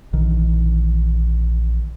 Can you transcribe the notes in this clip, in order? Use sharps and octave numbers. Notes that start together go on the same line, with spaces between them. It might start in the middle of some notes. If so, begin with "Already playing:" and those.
A#1 D#3 E3